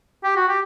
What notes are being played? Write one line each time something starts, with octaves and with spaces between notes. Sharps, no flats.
G4
F#4
G4